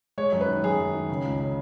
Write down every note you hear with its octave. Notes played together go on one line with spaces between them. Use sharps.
G#3 C#5
F#2
B4
D#3
F#2 G#4
F#2
D#3
C#3
C#2
C#3